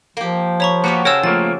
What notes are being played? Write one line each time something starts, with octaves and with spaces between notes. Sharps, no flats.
F3 A#3 G4
C#5 A#5 B5 C#6
A#3 B3 F#4 G4 C#5 F#5
C#3 A#4 C5 C#5 G#5 A5 E6
F3 A3 A#3 A6